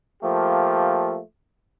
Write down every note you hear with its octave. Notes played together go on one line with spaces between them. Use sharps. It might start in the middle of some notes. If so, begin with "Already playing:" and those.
F3 A3 A#3 G4